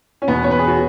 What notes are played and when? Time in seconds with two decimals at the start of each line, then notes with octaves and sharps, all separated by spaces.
0.22 C#4
0.27 E1 E2 B2 B3
0.44 C#5
0.51 B4
0.59 G#4
0.67 F#4